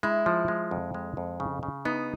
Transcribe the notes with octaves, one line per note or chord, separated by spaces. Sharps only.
G#3 E4
F3
G#3
F2
G#3
F2
C#3
C#3
B3 D#4